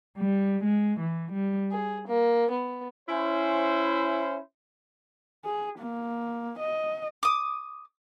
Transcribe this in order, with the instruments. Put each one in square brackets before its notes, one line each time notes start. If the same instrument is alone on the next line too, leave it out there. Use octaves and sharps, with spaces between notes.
[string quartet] G3
G#3
E3
G3
G#4
A#3
B3
[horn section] C#4 E4 C5
[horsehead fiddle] G#4
A#3
D#5
[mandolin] D6 D#6